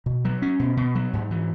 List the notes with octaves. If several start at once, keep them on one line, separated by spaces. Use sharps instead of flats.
B2
F#3
C#4
B2
B2
F#3
G#2
E3